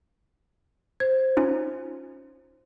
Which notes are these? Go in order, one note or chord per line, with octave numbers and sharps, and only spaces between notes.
C5 G#6
C#4 D#4 F4